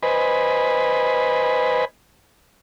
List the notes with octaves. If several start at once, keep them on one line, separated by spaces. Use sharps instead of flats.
B4 C5 D#5 G#5 B5